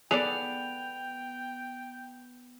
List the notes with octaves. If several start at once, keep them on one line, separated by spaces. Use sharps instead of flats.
B3 G#4 A4 D5 G5 F7